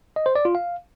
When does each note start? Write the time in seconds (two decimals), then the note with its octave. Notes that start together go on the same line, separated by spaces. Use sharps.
0.16 D#5
0.26 C5
0.36 D5
0.45 F4
0.55 F5